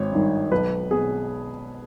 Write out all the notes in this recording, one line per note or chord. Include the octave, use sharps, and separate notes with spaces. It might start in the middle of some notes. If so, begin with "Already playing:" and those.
Already playing: G#1 C#5
G2 D#3
B1 B4
B2 G#4